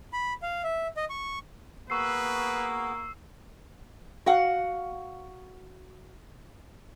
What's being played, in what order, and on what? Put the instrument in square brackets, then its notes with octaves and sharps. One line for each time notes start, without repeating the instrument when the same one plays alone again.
[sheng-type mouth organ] B5
F5
E5
D#5
C#6
[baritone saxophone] A#3 [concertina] B3 F#4 G#4 [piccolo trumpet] B4 [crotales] C#6 E6 C7
[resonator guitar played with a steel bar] F#4 F5 F#5